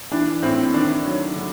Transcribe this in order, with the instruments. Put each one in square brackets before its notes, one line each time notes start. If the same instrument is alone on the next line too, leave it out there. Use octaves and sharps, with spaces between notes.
[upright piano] E3 D4
A2 C4
D#3 D4
F#3
D3